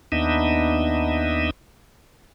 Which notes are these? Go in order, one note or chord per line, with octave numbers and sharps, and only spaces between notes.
D#2 B3 D4 D#4 D#5 E5